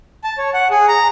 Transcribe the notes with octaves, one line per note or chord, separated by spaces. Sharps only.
A5
C#5
F#5
G#4
A#5